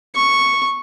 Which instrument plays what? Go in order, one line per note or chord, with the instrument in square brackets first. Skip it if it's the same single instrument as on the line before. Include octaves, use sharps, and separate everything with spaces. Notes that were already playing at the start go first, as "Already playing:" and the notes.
[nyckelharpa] C#6